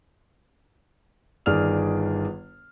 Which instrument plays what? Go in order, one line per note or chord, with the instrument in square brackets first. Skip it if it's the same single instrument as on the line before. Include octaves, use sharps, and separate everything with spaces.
[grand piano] G1 D#3 G#4 D5 F6 F7